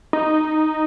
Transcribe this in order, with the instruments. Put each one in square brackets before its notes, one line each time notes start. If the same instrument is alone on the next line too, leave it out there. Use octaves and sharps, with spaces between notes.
[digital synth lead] D#4